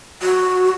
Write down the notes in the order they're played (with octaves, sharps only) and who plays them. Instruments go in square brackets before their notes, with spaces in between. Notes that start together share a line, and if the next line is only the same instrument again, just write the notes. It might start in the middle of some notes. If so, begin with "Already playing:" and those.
[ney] F#4